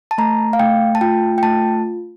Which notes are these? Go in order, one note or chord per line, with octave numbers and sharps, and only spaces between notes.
A5
A3 A#5
F5
A3 G5
A5
F4 G5
G5
A3 A5